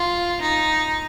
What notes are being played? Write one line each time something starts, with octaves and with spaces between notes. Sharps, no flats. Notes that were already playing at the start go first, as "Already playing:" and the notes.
Already playing: F4
D#4